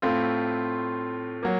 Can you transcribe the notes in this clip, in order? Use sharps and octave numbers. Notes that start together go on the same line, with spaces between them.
A2 A3 C4 F4
F#3 A#3